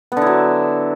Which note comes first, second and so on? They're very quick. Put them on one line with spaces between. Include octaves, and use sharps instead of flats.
B3 D3 E4 F#3